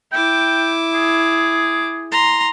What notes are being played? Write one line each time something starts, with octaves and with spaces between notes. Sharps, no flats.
E4 G5 D6
G#4
A#5 C6